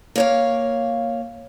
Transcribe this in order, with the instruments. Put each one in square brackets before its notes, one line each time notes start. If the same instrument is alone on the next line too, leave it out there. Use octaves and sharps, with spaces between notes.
[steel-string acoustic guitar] A#3 C#5 F5